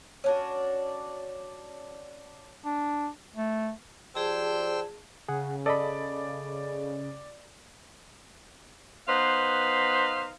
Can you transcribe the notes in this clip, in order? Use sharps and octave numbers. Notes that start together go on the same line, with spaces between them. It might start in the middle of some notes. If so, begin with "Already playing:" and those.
C#4 D4 F#4
D4
A3
F3 G4 G#4 C5 D5 G5 A5 E6
C#3 G#4 F#5
A4 D5 D#5 B5
B3 D#4 B4 C5 F5